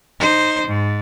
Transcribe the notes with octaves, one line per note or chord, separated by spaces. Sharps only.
D#4 C5
G#2